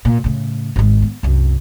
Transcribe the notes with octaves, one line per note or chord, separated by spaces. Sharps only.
A#2
A2 C#3
G#1 G#3
B3
C2 F#2